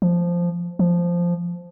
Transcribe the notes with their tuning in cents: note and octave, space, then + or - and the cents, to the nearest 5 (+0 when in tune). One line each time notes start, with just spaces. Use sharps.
F3 -5
F3 -5